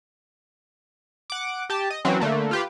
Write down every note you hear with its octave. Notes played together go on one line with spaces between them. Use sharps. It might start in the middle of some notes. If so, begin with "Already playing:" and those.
F#5 D6
G4 A5
D#5
E3 F#3 C4 C#4
D3 A3 A#3
F4 G4 B4